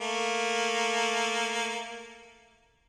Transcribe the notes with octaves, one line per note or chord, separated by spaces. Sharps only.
A3 A#3